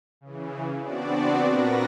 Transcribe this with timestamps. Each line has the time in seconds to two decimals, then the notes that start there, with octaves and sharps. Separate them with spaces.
0.21 C#3 E3
0.81 B3 C4 D4 F#4 D5
1.43 A#2 F#4 A#4 B4 A#6